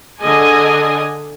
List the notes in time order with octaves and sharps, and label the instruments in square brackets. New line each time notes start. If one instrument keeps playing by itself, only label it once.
[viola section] D3 G#4 D#5 G#5